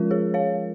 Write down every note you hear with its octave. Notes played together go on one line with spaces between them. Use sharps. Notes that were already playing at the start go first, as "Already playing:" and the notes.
Already playing: F3 G#3 C#4 F4 A#4
G#4 C#5
C#5 F5